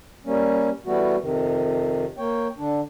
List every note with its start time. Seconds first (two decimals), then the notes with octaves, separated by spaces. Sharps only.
0.25 G3 A#3 C#4
0.86 E3 G3 A3 B3 F#4
1.21 F2 C3 D#3
2.18 A#3 C#5 G5
2.58 D3 D4